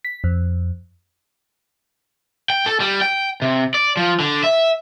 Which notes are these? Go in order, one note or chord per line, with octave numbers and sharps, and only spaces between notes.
B6
F2
G5
A4
G3
G5
C3
D5
F3
D3
E5